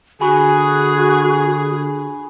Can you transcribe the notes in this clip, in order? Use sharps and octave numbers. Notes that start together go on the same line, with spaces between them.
D3 F#4 G#4 G#5 B5 C#6